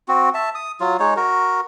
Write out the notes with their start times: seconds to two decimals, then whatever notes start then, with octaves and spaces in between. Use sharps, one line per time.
0.08 C4 F#4
0.34 E5 A5
0.55 D#6
0.80 F#3 F4
1.00 G#3 D#4 C#5
1.16 F#4 A#4